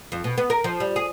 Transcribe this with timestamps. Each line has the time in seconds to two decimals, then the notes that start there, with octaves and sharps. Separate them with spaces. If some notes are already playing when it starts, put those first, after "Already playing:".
0.12 F2
0.24 B2
0.38 B3
0.50 A#4
0.64 F3
0.80 G3
0.96 G#4